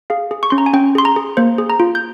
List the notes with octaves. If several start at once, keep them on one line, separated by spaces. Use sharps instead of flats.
G#4 F5
G#4
C#6
C#4 C6
A#5
G#5
C#4 G5
G#4 C6
A#5
G#4
A#3 C5
G#4
A#5
F4
G6